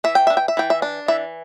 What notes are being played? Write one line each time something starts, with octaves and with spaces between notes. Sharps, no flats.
E3 E5
G5
D4 E5
G5
E5
E3 G5
E5
D4
E3 E5